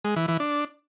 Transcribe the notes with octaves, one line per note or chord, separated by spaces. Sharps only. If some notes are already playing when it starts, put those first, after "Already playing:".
G#3
E3
E3
D4